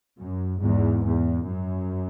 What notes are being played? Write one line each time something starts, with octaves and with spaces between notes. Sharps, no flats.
F#2
E2 G#2
E2
F#2